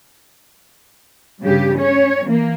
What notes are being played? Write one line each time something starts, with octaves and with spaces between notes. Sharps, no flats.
G2 C#3 G4
C#4 C#5
E3 A#3